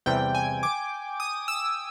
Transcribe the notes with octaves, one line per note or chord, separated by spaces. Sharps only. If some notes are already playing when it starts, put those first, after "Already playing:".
E2 C3 E3 G3 G5
G#5
D6
D#6
E6